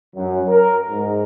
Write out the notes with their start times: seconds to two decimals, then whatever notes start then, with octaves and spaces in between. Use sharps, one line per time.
0.16 F#2
0.48 A#4
0.89 G#2